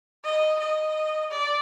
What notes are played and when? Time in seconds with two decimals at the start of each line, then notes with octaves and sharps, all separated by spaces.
0.24 D#5
0.59 D#5
1.31 D5